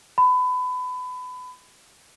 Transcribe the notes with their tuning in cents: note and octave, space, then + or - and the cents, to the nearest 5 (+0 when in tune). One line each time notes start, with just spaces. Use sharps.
B5 +25